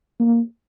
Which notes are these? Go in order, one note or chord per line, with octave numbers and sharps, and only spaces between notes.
A#3